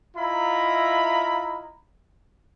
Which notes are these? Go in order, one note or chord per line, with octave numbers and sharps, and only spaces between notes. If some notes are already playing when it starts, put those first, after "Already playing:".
E4 F4 D#5 E5 A#5 B5